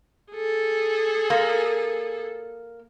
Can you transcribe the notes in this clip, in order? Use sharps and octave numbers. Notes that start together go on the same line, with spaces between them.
G#4 A4
A#3